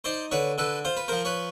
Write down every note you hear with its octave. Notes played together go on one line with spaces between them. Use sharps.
D#4 C5 D5
D3 B4 C#5
D3 A4 B4
F4 C5
B4
F3 A#4 C5
B4 C#5